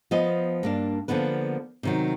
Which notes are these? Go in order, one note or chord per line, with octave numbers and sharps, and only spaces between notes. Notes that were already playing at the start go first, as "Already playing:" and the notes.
F3 B3 F4 D#5
G2 A#3 D4
D3 F3 A#3 B3 B4
C3 D#3 F#3